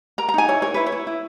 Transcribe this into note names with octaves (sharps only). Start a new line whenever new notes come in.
A#4 A#5
A#5
D#4 G#5
E4 C#5
A#4 C#5
E4 B4
C#5
E4
E4